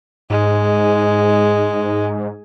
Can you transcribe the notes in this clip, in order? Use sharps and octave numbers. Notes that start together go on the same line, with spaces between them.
G#2 G#3